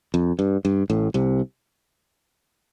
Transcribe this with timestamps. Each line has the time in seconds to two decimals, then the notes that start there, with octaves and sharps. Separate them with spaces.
0.14 F2
0.39 G2
0.65 G2
0.90 A1 A2
1.14 C2 C3